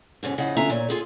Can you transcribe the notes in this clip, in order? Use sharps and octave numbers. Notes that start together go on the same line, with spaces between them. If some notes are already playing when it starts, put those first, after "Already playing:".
G#2 B2 D3 C#4
A2 C#3 F3 D#5 F#5
D3 B3 C#4 F4 E5 A#5
A#2 C#5
F4 G#4 A4